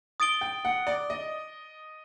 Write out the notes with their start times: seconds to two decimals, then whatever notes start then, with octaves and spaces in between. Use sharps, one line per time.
0.20 D#6 A6 D7 G7
0.41 G5
0.65 F#5
0.87 D5
1.10 D#5